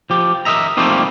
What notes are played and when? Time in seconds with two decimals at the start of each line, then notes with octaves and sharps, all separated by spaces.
0.10 F3 G4
0.45 A#4 B4 D#5 E5 A#5
0.77 F3 G3 A3 A#3 C4 D#4